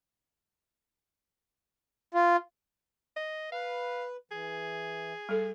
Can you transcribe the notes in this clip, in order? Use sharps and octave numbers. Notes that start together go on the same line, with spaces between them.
F4
D#5
B4 F5
E3 G#4
G3 A4